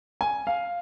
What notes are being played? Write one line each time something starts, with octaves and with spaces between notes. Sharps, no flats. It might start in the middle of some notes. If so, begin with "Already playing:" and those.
G#5
F5